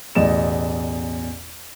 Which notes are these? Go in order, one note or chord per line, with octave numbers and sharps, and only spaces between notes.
A1 E2 B2 D5 D#5 E7